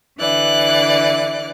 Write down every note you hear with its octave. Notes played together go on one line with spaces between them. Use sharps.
D3 E3 D5 F#6